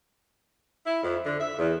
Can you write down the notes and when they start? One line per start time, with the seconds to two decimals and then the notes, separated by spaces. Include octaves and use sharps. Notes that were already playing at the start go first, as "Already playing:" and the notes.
0.86 E4
1.03 F2
1.25 D3
1.40 E5
1.59 E2